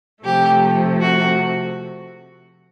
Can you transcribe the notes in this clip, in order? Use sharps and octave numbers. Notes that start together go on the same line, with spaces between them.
C3 F3 A3 G4
F#4